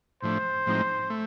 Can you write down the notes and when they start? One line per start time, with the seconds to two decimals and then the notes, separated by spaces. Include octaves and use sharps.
0.22 A2 F3 A3 D4 C5
0.66 A2 F3 G#3 C4 D#4
1.10 A3